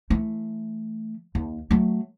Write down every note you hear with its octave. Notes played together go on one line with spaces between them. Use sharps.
E3 A3
D#2
F#3 A3